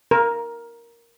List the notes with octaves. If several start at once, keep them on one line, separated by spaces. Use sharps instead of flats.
A#4